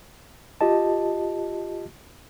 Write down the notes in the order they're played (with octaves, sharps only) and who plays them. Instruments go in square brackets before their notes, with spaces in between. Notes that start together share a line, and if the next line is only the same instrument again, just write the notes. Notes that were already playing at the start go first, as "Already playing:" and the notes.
[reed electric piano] F4 G4 D#5 A5